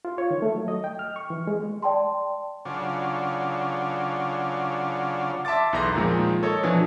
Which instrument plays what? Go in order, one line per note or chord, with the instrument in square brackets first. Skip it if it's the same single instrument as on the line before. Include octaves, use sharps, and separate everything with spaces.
[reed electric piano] F4
C#5
D#3
A3
F#3
D#5
G5
F6
C#6
E3
G#3
[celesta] D5 G5 A5 C6
[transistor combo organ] C#3 F#3 D4 F4
[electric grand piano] E5 A5 C6 D6 A6
B1 E2 E3 A#5 C6 A#6
A#2 D#3 F3 G#3 D#4
A4 C#5 D#5
B2 E3 F3 D4 G#5